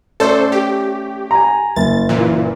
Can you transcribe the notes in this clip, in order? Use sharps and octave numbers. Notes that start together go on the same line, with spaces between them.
A3 C#4 A4 C5 D5
G4
G#5 A#5
F#1 A6
A#2 E3